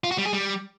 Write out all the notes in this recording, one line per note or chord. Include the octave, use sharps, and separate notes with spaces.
F4
F#4
G3
G#4
G3